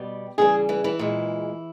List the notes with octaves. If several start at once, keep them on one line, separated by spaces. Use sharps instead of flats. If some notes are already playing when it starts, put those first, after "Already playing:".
Already playing: B2 G3 G4
C#3 E3 G3 G#3 G#4
E3 E4
E3 E4
A#2 G#3